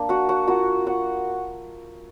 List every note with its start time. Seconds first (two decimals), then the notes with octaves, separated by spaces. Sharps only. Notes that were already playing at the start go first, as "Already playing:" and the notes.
Already playing: A#3 D4
0.09 F#4 F#5
0.29 F#4 F#5
0.47 A#3 F4 F#4 F#5
0.86 F#4 F#5